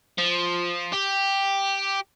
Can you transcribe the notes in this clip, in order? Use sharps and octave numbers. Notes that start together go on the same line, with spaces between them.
F3
G4